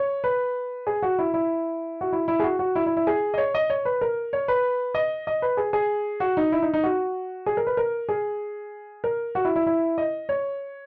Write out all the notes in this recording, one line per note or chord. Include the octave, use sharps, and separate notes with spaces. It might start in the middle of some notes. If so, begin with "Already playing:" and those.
Already playing: C#5
B4
G#4
F#4
E4
E4
F#4
E4
E4
G#4
F#4
F#4
E4
E4
E4
G#4
D#5
C#5
D#5
C#5
B4
A#4
C#5
B4
D#5
D#5
B4
G#4
G#4
F#4
D#4
E4
D#4
D#4
F#4
G#4
A#4
B4
A#4
G#4
A#4
F#4
E4
E4
E4
D#5
C#5